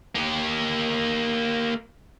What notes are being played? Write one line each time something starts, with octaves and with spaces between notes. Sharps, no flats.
A#3 G4